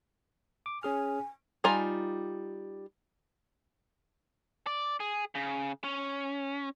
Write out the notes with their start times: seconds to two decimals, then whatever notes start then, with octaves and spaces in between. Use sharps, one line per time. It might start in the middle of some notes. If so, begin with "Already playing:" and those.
0.66 D6
0.83 C#4 G#4 G#5 F6
1.64 G3 D#4 F4 G#5 A#5
4.67 D5
5.00 G#4
5.35 C#3
5.84 C#4